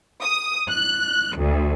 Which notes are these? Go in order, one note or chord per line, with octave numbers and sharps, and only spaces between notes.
D#6
F#6
D2